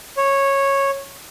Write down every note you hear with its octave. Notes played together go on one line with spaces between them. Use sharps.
C#5